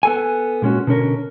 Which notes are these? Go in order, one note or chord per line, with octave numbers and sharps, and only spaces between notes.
B3 A4 G#5
A#2 G#3 C#4 F#4
B2 D3 C#4 A#4